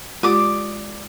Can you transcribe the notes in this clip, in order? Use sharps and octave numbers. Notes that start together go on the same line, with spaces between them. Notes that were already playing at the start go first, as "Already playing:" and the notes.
G#3 F4 G4 D5 D6 D#6